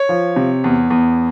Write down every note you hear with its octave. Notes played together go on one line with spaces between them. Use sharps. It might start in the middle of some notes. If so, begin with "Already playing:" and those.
Already playing: C#5
F3
C3
E2
E2